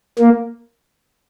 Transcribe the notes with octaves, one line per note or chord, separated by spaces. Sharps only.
A#3